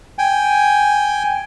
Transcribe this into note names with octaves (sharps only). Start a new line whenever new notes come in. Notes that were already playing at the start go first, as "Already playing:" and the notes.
G5 G#5